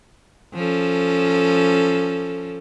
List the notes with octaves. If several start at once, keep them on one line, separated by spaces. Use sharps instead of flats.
F3 C#4 A4